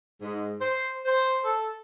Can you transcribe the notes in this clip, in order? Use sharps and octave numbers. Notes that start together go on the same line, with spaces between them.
G#2
C5
C5
A4